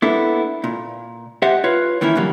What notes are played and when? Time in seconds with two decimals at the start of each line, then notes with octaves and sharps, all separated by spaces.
0.02 A#3 B3 D4 E4 A4
0.64 A#2
1.42 G4 C5 D#5 E5 F#5
1.64 F4 B4 C#5
2.01 D#3 E3 A#3 C#4 E4
2.15 A#2 D3 E3 F#3 G3 A#3